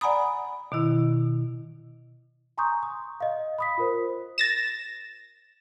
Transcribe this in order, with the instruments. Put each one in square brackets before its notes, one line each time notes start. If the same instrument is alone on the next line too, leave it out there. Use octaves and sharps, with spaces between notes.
[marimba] D5 F#5 G#5 A#5 B5 D#6
B2 D#3 E4
[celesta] G#5 A#5 C6 C#6 D#6 G6
D#6
D#5 F5
B5 D#6 B6
F4 A#4 C5
[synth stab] A6 A#6 E7